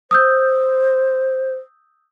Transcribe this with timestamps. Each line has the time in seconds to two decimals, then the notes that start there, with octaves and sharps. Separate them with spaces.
0.11 C5 D#6 E6 G6